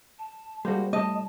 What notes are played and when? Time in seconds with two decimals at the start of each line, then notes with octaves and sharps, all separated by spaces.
0.18 A5
0.65 G3 G#3 A#3 F#4 C5
0.93 A2 G3 D#5 A5